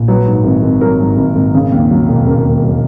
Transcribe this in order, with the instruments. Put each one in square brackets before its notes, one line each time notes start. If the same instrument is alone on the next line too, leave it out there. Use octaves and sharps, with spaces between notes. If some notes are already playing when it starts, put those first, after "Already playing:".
Already playing: [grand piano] A#1
F#3 B4
G#2
G#1
G#1
F#3 A#4
G#2
G#1
G#1
C#3
D#2
F#3
E1
C#3 A#4
D#2
F#3